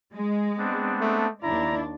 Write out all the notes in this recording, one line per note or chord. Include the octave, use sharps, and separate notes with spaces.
G#3
B3 C4 D4
A3
D#2 D4 E4 A#5